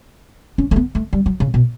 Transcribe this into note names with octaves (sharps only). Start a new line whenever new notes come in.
C#4
A3
B3
A3
G3
F#3
C#3
B2